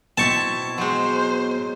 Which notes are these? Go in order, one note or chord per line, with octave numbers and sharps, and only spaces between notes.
B2 C4 E4 A5 C#6
F#3 G#3 C5